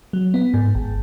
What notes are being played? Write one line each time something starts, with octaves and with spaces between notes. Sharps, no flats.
F#3
B3
G#2
G#1